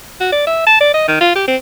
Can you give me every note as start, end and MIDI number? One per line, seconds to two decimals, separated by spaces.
0.20 0.28 66
0.32 0.46 74
0.47 0.66 76
0.67 0.80 81
0.81 0.90 74
0.94 1.06 75
1.08 1.18 51
1.21 1.32 65
1.36 1.46 67
1.48 1.56 60